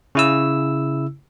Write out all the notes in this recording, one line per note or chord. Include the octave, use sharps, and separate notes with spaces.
C#3 E4 E6